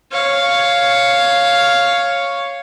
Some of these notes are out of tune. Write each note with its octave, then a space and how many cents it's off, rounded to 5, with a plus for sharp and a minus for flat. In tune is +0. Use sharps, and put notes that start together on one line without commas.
C#5 +0 F5 +0